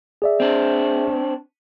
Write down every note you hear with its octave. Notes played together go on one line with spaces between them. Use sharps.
G#4 D5 E5
C4 D4